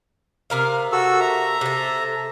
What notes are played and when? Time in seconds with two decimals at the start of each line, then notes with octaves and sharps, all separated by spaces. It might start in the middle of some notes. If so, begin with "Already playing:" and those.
0.50 C3 A#4 F5
0.92 F#4 A4 E6
1.20 E5 A#5
1.61 C3 A4